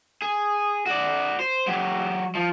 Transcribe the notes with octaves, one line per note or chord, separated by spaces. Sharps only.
G#4
F#4 D5
C5
F#3 G4
F3